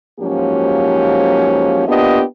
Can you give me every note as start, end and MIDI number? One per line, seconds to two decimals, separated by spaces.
0.20 1.85 44
0.20 1.85 53
0.20 1.85 54
0.20 1.85 58
0.20 1.85 61
0.20 1.85 67
1.87 2.22 58
1.87 2.22 59
1.87 2.22 62
1.87 2.22 65
1.87 2.22 67
1.87 2.22 75